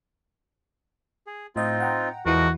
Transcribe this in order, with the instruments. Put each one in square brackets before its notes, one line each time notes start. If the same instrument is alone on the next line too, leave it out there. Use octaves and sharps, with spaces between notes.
[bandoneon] G#4
[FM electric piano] A2 D#5 [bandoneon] C4 D#4 F4
[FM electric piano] F#5 G5 A#5
[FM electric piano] E2 E3 E4 [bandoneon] F3 G#3 A#4 [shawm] F#4